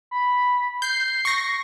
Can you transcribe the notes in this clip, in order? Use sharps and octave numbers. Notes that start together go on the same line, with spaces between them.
B5
G6 C7
C#6 A#6